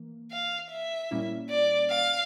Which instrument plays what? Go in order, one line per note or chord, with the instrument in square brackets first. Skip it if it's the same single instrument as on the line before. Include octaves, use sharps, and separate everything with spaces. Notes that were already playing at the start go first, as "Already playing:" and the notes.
Already playing: [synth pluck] E3 A#3
[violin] F5
E5
[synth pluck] A#2 G3 A#3 C#4 E4
[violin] D5
F5